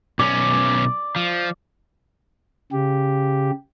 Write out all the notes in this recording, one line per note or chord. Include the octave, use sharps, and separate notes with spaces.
B1 C#4 D5
F3
C#3 G4